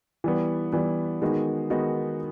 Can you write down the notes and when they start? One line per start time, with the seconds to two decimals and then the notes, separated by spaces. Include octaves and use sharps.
0.24 E3 G3 B3
0.73 E3 G3 B3
1.22 D#3 G#3 B3 D#4 F#4
1.70 D#3 G#3 B3 D#4 F#4